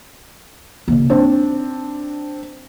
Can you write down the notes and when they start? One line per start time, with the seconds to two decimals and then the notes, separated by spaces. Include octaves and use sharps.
0.88 C#3 A#3
1.10 C4 D4 D#4